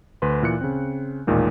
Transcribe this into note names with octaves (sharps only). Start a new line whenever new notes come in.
D2 B4 C6
A#2 E3 F#6 C#7
C#3 C4
A1 D#2 A#2 D#3 G#3